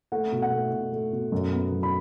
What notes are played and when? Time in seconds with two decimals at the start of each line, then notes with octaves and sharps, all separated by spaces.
0.12 A3 F#5
0.32 B2
0.42 F#5
0.52 A3
0.72 B2
0.92 A3
1.12 B2
1.32 F#2
1.52 B3
1.72 F#3
1.83 B5